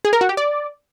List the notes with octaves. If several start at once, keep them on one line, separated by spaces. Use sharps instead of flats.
G#4
A#4
F#4
G4
D5